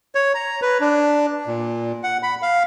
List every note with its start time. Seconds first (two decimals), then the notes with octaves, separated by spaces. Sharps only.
0.15 C#5
0.34 A#5
0.62 B4
0.80 D4
1.47 A#2
2.04 F#5
2.23 B5
2.42 F5